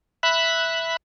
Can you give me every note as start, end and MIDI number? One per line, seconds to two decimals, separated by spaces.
0.23 0.96 76
0.23 0.96 83
0.23 0.96 90